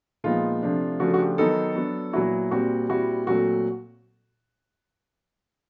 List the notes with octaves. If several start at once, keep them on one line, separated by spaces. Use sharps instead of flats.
A#2 F3 G#3 B3 D#4 F4
C3 F3 A3 D4
C#3 F3 A3 D4 F#4
F#4
G4
D#3 F#3 B3 D#4 A4
F#3 B3 D4
A#2 F#3 B3 E4 F#4
A#2 G3 C4 F#4
A#2 G3 C4 E4 F#4
A#2 F#3 A3 C4 F#4